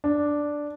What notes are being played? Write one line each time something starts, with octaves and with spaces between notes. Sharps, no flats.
D4